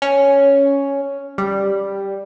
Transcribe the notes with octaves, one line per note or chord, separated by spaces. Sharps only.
C#4
G3